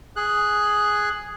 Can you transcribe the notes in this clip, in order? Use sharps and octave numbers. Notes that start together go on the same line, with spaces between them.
G#4 F#6